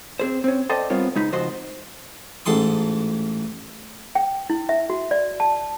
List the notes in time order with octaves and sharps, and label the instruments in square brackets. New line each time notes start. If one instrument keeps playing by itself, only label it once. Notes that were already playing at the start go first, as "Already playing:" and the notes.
[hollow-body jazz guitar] C4 G#4 C5
C4 C#4
A4 C5 D5 D#5 G5
G3 B3 C4 F4 A#4 C#5
C#2 G#3 D#4 B5
C#2 F3 F#4 C5 D#5 C6
[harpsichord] A1 G#2 A4 C6 D#6
[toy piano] G5
E4
E5
F#4
D5
A5